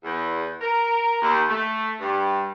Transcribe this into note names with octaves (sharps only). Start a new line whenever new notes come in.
E2
A#4
D#2
A3
G2